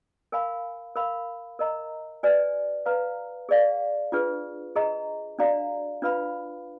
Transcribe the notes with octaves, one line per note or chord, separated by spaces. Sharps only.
A#4 F5 G#5 B5
A#4 F5 B5
A#4 D#5 A#5
F#4 B4 D5 G#5
B4 F5 A#5
G#4 D5 F5
D4 F4 G#4 B4
G#4 D#5 A#5
D4 F#4 D5 F5 A#5
D4 F4 B4 F5 B5